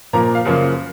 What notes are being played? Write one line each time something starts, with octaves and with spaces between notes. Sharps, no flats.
A#2 F3 A#3 A#5
F5
F#2 C#3 F3 A#3